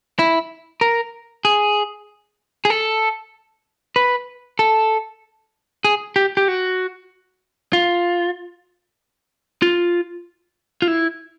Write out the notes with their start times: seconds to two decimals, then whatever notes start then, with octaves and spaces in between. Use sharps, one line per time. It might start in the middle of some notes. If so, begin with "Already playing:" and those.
0.19 E4
0.81 A#4
1.45 G#4
2.65 G#4
2.70 A4
3.96 B4
4.59 A4
5.85 G#4
6.16 G4
6.37 G4
6.48 F#4
7.73 F4
9.62 F4
10.82 F4
10.88 E4